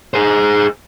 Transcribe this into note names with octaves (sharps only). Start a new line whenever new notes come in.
G#4 C5